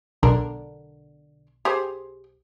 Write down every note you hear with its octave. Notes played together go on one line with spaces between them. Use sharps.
B1 D3 D4 A#4
G4 G#4 C5